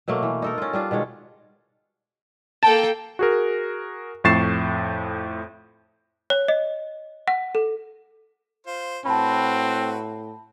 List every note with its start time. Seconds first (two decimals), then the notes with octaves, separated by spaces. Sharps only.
0.08 B2 F#3 A3 A#3
0.23 E3
0.42 D#4 A4 A#4
0.58 C#4 F4
0.73 G3 D4 F4
0.91 B2 D#3 G#3 C#5
2.63 A#3 A4 G5 A5
3.19 F#4 G#4 A#4
4.24 F2 A2 C#6 A6 C7 E7
6.30 C#5
6.48 D#5
7.28 F#5
7.55 A4
8.67 F4 C5
9.06 A2 C4 F#4 B4 A5 B5